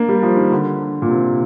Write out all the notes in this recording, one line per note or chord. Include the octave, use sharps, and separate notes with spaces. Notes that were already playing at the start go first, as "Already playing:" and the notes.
Already playing: A#3 D4
G3
F3
D#3
D3
A#2
C3